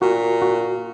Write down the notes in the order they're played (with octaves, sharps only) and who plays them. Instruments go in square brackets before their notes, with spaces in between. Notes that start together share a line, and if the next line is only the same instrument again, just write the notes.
[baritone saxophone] A#2 [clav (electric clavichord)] F#4
[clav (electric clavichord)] F#4